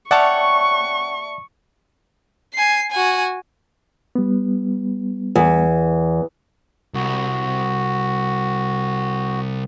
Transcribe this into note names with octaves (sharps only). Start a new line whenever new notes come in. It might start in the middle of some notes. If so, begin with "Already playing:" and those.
C#4 C#5 D5 E5 F#5 G5 A5 C#6
G#5 C7
F#4 G#5
G3 B3
E2
C2 F#4